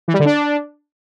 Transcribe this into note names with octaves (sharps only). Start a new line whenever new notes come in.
E3
G3
D3
D4